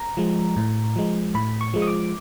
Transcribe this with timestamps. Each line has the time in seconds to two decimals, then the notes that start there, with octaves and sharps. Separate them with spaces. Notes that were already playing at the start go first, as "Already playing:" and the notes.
Already playing: A#5
0.17 F3 G#3
0.56 A2
0.96 F3 G#3
1.34 A2 B5
1.61 C#6
1.74 F3 G#3
1.82 D#6
1.87 D6